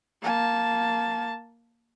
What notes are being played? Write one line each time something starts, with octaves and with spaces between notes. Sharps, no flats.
A#3 A5